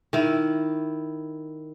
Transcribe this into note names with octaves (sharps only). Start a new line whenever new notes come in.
D#3 E4